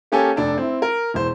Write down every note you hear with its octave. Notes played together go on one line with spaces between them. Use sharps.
A#3 C#4 G4 A4 G#5
F1 D4 A4
C4 E4
A#4
E1 E3 C5